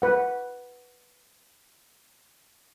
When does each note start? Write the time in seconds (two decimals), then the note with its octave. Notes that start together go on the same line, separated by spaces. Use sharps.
0.02 B4 F#5